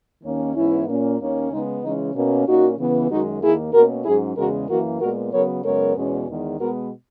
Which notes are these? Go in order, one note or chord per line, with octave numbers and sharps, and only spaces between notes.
D#2 D#3 A#3 C#4
G#2 E3 B3 C#4 E4
A#2 A#3 C#4
D#2 D#3 A#3 C#4
C#3 G#3 B3 D#4
C#3 E3 G#3 C#4 D#4
B2 A#3 C#4
A#2 A#3 C#4 D#4 F#4
C#3 E3 B3
F#2 D#3 G#3 D#4 F#4
D#2 D#3 A#3 E4 G#4
B2 A#3 C#4 F#4 A#4
G#2 F#3 C#4 E4 G#4
E2 C#3 G#3 F#4 A#4
F#2 E3 A#3 F#4 A#4
A#2 G#3 B3 F#4 A#4
C#3 F#3 B3 A#4 C#5
F#2 C#3 G#3 B3 A#4 C#5
E2 B2 G#3 C#4
E2 D#3 G#3 B3
B2 G#3 B3 F#4 A#4